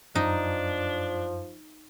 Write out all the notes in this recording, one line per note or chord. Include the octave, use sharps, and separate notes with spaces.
F#2 F3 D4 D#4